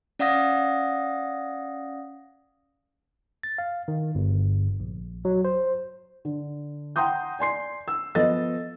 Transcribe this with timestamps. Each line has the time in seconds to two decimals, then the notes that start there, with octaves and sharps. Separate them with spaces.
0.19 C#4 D5 F5 F#5 D#6 A#6
3.43 A6
3.58 F5
3.88 D#3
4.15 G1
4.80 A#1
5.25 F#3
5.45 C5
6.25 D3
6.96 F#5 G5 A#5 C6 D#6 G6
7.39 D5 G#5 C6 C7
7.88 E6
8.15 F3 B3 A4 D#5 A6